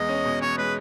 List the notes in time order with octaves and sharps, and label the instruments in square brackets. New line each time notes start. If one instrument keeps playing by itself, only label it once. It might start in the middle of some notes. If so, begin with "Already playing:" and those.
Already playing: [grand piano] E2 G#3 [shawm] D#5
[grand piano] C#4
B2
[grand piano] E2 [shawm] C#5
[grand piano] G#3 [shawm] B4